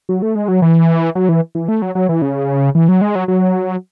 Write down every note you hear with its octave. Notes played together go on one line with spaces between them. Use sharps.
F#3
A3
G#3
F#3
E3
F#3
E3
E3
A3
F#3
F#3
E3
C#3
E3
F#3
G#3
F#3
F#3